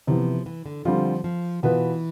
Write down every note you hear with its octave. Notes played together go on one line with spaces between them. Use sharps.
C3 E3 F3 B3
E3
D3
D3 F3 G3 C4 F4
F3
B2 E3 B3 F4 B4